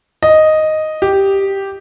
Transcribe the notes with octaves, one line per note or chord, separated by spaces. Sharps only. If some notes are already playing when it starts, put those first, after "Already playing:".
D#5
G4